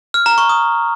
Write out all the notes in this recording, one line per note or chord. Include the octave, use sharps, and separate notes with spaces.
F6
A#5
C#6
D#6